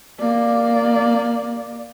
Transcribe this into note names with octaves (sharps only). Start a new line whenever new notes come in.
A#3 D5